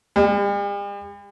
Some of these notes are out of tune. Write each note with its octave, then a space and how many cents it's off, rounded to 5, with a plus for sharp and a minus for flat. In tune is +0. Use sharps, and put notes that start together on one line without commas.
G3 +45